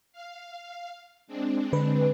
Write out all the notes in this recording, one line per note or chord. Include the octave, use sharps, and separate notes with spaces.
F5
G#3 C4 D4
D3 B4